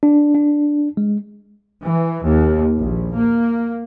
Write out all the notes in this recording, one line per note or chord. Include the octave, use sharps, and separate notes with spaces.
D4
D4
G#3
E3
D#2
A#1
A#3